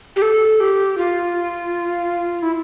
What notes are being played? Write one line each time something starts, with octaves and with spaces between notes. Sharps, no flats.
G4
A4
G4
F4
E4